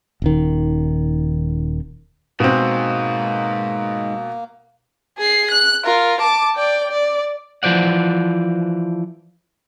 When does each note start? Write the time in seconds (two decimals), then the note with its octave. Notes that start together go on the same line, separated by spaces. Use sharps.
0.22 D#1 D#3
2.40 G#2 B2 A#3 C4
5.18 G#4 C7
5.51 F#6
5.84 F4 A#4
6.21 A5 D6
6.56 D5 G5
6.91 D5
7.63 E3 F3 C5 D5 F#5